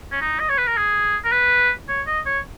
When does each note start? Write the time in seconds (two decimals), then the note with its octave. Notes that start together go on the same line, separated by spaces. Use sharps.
0.12 C#4
0.21 D#4
0.40 D#5
0.49 C#5
0.58 B4
0.68 A#4
0.77 G#4
1.24 A#4
1.32 B4
1.89 C#5
2.07 D#5
2.26 C#5